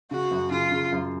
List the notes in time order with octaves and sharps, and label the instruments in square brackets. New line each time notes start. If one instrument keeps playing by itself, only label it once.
[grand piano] C#3 [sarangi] F#4
[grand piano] F#2
[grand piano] C#3 [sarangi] F4
[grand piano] C#3
F#2